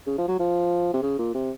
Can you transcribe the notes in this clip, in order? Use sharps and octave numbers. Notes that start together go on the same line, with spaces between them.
C#3
F3
F#3
F3
C3
C#3
A#2
C3